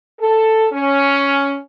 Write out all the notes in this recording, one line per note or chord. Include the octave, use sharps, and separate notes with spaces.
A4
C#4